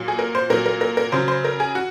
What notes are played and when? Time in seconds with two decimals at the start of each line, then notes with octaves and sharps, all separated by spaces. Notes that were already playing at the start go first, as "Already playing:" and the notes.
Already playing: A#2 F#3
0.08 G#4
0.19 A#4
0.35 C5
0.50 A#2 F#3 A#4
0.66 A#4
0.81 A#4
0.97 A#4
1.12 C#3 F#3 C5
1.28 C5
1.45 A#4
1.60 G#4
1.75 F#4